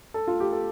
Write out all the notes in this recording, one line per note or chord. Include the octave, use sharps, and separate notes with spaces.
A4
F4
G4
A4